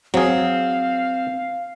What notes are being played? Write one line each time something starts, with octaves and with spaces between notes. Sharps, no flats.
F#3 C4 G#4 F5